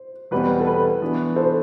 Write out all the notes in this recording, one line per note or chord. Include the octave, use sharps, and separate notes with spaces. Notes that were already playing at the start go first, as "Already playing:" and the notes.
Already playing: C5
E2 B2 G3 C4 B4
A4
B4
E3 B3 D4 F#4
A4 C5